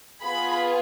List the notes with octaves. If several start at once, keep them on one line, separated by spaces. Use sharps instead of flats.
B3 F4 G#4 B5